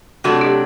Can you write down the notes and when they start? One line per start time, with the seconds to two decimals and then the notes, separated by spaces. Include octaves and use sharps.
0.24 C3 F#3 A3 D4 F#4
0.41 G4